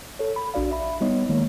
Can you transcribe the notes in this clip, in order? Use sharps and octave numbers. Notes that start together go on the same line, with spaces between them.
A4 C#5
B5
A#1 D4 F#4 D5 F5
E5 B5
G3 B3 D#4 C#5 D#5
D#3 G#3 A#3 C#5